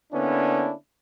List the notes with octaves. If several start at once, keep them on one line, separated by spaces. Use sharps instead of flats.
D3 A#3 B3 C#4 D4 E4